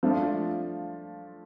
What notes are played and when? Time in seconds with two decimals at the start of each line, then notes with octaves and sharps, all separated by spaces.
0.03 F3 A3 D4 F4